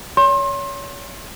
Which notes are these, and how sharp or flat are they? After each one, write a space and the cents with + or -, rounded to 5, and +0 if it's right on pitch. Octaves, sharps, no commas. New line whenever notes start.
C#5 +30 C6 +30